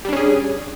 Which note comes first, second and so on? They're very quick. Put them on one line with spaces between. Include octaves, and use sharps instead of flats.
G3 D4 C#4 G#4